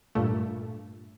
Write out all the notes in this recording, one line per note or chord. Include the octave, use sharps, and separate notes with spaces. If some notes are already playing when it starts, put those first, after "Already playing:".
G2 A#2 A3